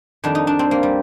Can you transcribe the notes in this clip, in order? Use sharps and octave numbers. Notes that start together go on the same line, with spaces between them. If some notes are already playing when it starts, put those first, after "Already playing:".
F2 D#3 G3 D4
D#4
D4
C4
A#3
G3